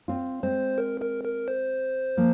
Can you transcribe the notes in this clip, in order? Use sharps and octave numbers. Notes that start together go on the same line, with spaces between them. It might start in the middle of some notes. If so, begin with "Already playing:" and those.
C4 F4
G#3 C4 C5
A#4
A#4
A#4
C5
F3 A#3